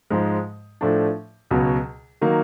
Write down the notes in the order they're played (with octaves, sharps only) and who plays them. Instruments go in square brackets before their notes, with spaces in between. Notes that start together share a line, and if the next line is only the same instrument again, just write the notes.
[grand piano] G#2 F3 G#3
A2 F3 A3 D4
C#2 B2 F#3
D#3 F#3 A#3